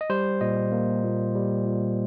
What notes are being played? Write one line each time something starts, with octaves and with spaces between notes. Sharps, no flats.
D#5
G3 C5
A#2 D#5
A#3
A#2
G3
A#2